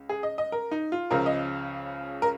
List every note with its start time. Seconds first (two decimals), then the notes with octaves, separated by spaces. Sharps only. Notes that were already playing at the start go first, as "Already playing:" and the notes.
Already playing: C#2
0.09 G#4
0.23 D#5
0.38 D#5
0.52 A#4
0.71 D#4
0.92 F4
1.11 C#2 C#3 F3 A#4
1.26 D#5
2.22 A#4